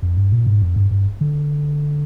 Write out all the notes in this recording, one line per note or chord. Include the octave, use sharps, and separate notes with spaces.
F2
G2
A#2
G#2
F2
G2
G2
D3